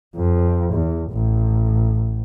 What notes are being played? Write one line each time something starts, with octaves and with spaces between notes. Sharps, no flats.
F2
E2
A1